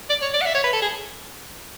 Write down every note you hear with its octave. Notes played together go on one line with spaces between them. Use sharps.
D5
C#5
D5
F#5
E5
C#5
B4
A4
G#4